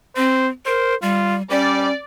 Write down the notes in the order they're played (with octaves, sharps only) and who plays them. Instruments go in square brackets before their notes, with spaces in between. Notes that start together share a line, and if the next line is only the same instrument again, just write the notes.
[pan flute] C4 [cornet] C5
[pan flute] A#4 [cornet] C5
[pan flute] G3 [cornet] F4
[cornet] G3 [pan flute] C#4 [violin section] D5